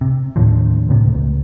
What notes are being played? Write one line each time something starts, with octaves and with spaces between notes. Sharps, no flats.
C3
D#2 A2 D3 F3
C#2 A2 C3
C#2